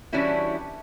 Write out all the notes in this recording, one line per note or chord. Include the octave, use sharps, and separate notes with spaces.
E3 G3 C#4 D4 E4 F#4